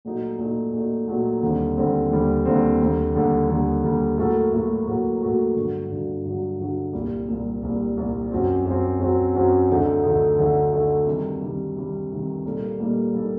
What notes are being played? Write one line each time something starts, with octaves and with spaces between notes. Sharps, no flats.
A#2 F#3 A3 D#4
A#2 F#3 A3 D#4
A#2 F#3 A3 D#4
A#2 F#3 A3 D#4
D#2 D3 G3 C4
D#2 D3 G3 C4
D#2 D3 G3 C4
D#2 D3 G3 C4
D#2 D3 G3
D#2 D3 G3
D#2 D3 G3
D#2 D3 G3
A2 F#3 A#3 F#4 A4
A2 F#3 A#3 F#4 A4
A2 F#3 A#3 F#4 A4
A2 F#3 A#3 F#4 A4
G2 D3 F#3
G2 D3 F#3
G2 D3 F#3
G2 D3 F#3
C2 A#2 G3
C2 A#2 G3
C2 A#2 G3
C2 A#2 G3
F#2 F#3 C4
F#2 F#3 C4
F#2 F#3 C4
F#2 F#3 C4
D2 D3 A3 D#4
D2 D3 A3 D#4
D2 D3 A3 D#4
D2 D3 A3 D#4
C3 D#3 G3
C3 D#3 G3
C3 D#3 G3
C3 D#3 G3
A#2 G3 A#3 D#4 A4
A#2 G3 A#3 D#4 A4
A#2 G3 A#3 D#4 A4